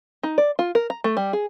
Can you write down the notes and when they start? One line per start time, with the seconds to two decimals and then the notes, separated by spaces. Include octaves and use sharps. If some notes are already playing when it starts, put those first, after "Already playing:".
0.23 D#4
0.38 D5
0.59 F4
0.75 A#4
0.90 A#5
1.04 A3
1.17 G3
1.33 G#4